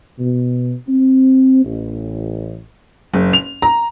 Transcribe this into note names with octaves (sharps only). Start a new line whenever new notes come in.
B2
C4
A1
F#1
F7
A#5